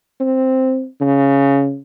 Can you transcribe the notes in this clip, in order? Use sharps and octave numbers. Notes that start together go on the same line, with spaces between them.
C4
C#3